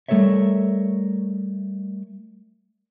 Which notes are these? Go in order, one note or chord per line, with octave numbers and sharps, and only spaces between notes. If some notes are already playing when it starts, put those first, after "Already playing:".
G3 A3 A4 A#4 C#5 E5